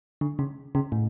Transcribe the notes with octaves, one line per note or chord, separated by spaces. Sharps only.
D3
C#3
C#3
A2